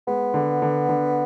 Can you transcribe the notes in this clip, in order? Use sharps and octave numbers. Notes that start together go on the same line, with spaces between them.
G#3 B3
D3
D3
D3